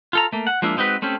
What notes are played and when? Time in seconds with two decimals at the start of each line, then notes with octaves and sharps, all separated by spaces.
0.13 F4 A4 A#5
0.33 A3 A#3
0.47 F#5
0.62 F3 G#3 A#3 D4 E4
0.77 G#3 C4 D#4 F#4 B4
1.02 A3 C4 C#4 G4